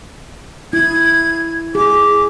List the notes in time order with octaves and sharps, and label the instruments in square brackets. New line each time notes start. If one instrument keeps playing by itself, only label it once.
[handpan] E4 [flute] G#6
[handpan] G#4 [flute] D6